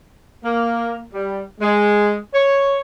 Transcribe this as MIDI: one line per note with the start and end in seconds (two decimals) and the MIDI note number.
0.45 1.02 58
1.13 1.43 55
1.61 2.17 56
2.34 2.79 73